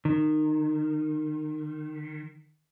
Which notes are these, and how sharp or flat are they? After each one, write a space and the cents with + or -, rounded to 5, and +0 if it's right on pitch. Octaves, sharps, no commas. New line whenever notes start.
D#3 -25